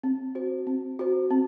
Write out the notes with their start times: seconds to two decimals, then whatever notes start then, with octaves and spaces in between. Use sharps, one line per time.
0.04 C4
0.35 F#4 C5
0.67 C4
0.99 F#4 C5
1.30 C4